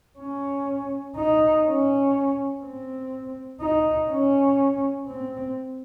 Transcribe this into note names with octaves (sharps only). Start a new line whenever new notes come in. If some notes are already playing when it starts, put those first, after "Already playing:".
C#4
D#4
C#4
C4
D#4
C#4
C4